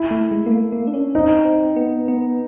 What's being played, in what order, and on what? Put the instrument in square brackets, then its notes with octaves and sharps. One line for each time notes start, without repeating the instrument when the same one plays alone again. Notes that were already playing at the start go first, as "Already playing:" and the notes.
Already playing: [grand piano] E4
[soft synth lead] A3
G#3
A#3
A3
A#3
D4
C#4
[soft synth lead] C4 [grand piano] D#4
[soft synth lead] C4
B3
B3